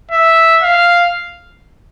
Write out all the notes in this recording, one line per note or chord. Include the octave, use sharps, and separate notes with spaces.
E5
F5